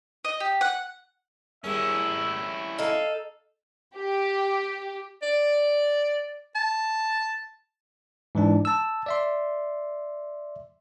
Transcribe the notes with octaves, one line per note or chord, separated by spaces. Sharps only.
D#5
G4
F#5
G3 C#4 E4 G#4 A#4 E5
D#4 A4 F5
G4
D5
A5
G#2 E3 D4
A5 E6
D5 E5 C6